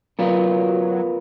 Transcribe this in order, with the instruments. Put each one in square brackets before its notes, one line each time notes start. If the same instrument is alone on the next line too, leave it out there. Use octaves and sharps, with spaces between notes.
[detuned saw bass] F#3 [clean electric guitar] B3 F4 A#4